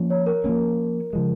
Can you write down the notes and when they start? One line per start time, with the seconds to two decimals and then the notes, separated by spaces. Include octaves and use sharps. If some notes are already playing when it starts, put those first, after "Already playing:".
Already playing: F3 A#3 C#4
0.10 C#5
0.26 A#4
0.44 F3 A#3 C#4
1.13 C#3 F3 G#3